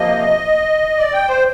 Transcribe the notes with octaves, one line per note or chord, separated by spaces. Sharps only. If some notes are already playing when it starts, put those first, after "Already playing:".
Already playing: C3 F3 A#3 D#5
D5
G5
C5